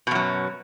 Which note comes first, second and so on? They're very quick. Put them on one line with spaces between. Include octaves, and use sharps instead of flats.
B2 F#2 F#3